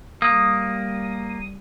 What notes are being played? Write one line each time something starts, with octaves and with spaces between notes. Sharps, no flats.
G3 A#3 D#6